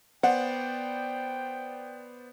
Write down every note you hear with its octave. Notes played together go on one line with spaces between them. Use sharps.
B3 C5 D5 F#5 G5